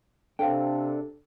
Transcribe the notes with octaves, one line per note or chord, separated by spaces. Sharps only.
C3 D4 A4 C5 F5 G5